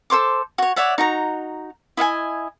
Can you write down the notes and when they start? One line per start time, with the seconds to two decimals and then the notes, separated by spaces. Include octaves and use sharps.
0.10 A4 C5 C6 D6
0.58 F#4 C#5
0.76 C#5 D5 E5 F#5
0.98 D#4 F#4 A#5
1.97 E4 D#5 F5 G#5